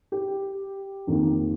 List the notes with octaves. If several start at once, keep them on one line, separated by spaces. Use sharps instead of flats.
G4
F2 D#3 A#3